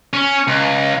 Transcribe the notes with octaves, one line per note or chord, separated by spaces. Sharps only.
C#4
C#2